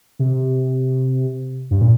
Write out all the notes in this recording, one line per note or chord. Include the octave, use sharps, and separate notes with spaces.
C3
G2
A#2